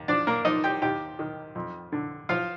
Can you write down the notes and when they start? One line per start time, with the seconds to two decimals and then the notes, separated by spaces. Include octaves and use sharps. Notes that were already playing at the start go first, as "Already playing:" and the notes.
Already playing: D#2
0.08 F3 D4 D5
0.27 A#3 A#4
0.45 F3 D#4 D#5
0.64 G4 G5
0.82 D#2 G4 G5
1.19 D#3
1.55 F2
1.92 D3
2.29 F3 F4 F5